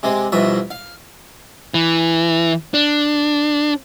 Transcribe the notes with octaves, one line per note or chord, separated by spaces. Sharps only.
C3 G#3 C4
C2 F2 B2 E5
F5
E3
D4